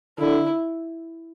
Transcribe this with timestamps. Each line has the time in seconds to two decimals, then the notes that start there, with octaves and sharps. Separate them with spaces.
0.19 D3 E4